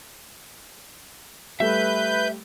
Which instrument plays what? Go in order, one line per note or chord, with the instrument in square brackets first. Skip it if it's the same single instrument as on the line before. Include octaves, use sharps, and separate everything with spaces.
[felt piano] G3 A3 [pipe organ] B4 G6 [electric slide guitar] E5